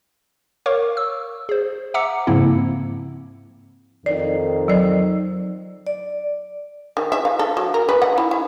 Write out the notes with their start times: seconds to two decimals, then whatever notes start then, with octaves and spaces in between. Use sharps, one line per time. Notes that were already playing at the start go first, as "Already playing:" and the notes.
0.66 A#4 C#5 F5 C#6 D6
0.97 E6
1.49 G#4 C5
1.94 E5 F#5 A#5 D6 E6 C#7
2.27 G#2 C#3 F3 A#3 C4 E4
4.06 F2 D#3 D#4 D5
4.68 F#3 D5
5.87 D5
6.97 D#3
7.12 E5
7.25 F5
7.39 A4
7.57 F#3
7.74 A#4
7.89 B4
8.02 F#5
8.18 E4
8.31 E4